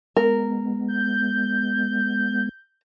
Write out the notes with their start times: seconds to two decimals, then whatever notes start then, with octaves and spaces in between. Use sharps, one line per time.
0.17 G#3 B3 A#4
0.88 G6